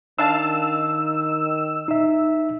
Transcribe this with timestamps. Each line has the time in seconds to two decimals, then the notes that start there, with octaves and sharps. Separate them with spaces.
0.18 D#3 D4 F5 A5 E6
1.88 D#4 E5